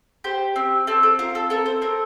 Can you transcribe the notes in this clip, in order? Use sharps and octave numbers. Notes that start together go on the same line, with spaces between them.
G4 C5
C4
C4 A4
A4
F4 A#4
A4
A4 A#4
C5
C4 A#4